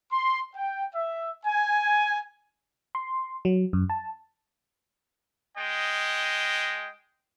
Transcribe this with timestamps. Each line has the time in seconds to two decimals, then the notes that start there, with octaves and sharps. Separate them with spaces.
0.11 C6
0.55 G5
0.95 E5
1.46 G#5
2.95 C6
3.45 F#3
3.73 F#2
3.90 A5
5.57 G#3 D#5 G5